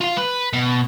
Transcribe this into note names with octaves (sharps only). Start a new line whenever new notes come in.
F4 F5
B4
B2